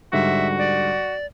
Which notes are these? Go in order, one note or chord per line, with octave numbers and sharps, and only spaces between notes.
G#2 D3 G3 F#4 E5
D5